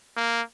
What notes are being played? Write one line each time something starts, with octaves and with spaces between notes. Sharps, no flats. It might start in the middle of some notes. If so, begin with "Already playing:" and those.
A#3